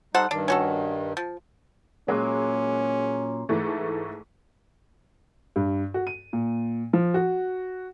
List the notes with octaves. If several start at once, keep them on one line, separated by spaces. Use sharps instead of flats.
G3 D#4 A4 C5 F#5
G2 D#3 D4
C#4 F#4 A4
F3
A#2 F#3 G#3 A#3 C#4
G#2 E3 A3
G2
F#4
D#7
A#2
F3
F#4